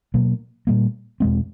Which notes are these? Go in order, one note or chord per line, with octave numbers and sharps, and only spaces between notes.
B2 F#3 A#3
A#2 G3 A#3
E2 B2 G#3 C4